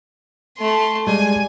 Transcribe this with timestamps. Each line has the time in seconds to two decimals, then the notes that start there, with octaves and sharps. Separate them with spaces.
0.57 A3 C6
1.07 G3 G#3 D5 G#5